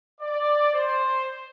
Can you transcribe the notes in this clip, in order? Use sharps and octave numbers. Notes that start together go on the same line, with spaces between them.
D5
C5